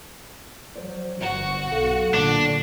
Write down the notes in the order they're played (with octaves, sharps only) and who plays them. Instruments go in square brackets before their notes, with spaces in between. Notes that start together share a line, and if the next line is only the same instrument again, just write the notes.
[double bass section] F#3 [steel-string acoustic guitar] C5 D5
[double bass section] G1 [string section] F#4
[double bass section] B1 [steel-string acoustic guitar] A4 F5 G5
[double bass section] A#2 D3 [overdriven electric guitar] D4